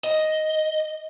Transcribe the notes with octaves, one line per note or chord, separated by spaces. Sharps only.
D#5